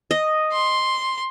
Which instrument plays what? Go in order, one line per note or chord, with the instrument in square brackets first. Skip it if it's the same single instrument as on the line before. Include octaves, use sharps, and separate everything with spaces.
[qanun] D#5
[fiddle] C6